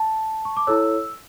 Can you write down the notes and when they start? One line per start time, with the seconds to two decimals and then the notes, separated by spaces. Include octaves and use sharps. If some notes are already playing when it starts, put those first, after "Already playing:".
Already playing: A5
0.45 C#6
0.57 D6
0.67 E4 A4 C#5 E6